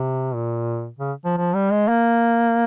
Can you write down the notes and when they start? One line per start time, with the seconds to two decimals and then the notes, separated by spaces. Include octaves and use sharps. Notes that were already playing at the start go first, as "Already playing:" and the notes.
Already playing: C3
0.35 A#2
0.99 C#3
1.25 F3
1.37 F3
1.55 G3
1.72 G#3
1.88 A#3